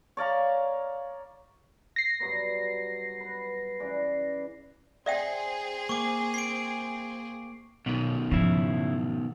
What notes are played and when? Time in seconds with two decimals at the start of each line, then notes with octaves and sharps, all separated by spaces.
0.17 C#5 D5 F5 A#5
1.96 A#6 C7
2.20 G2 F#3 B3
3.21 B4
3.80 C#3 E3 D5
5.06 C4 G#4 D5 E5 G5
5.89 A#3 C#6 D6
6.34 C7 D7
7.86 B1 B2 D#3
8.31 G#2 C#3 F3 E4